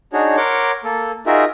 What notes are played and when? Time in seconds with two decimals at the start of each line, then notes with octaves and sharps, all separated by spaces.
0.13 D4 D#4 F#4 G#4 C#5
0.37 A#4 C#5 F#5 C6 D6
0.84 A#3 A4
1.27 D#4 F4 F#4 G#4 A#4 E5